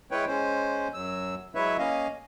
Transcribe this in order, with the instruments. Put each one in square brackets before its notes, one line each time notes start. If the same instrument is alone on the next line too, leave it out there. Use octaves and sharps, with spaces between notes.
[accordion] G#3 E4 B4 C#5 G5
G#3 C#4 C5
F#2 F#3 E6
F#3 G#3 E4 B4 C#5 E5
A#3 C#4 D#5 F5